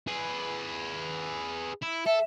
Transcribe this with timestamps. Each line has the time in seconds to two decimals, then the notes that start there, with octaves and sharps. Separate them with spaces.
0.08 G#4 B4
1.82 E4
2.06 A4 E5